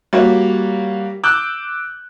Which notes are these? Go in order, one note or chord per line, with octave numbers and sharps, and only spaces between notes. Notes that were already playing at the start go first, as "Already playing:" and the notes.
G3 A#3 F#4 C#5
D6 E6 F#6 G6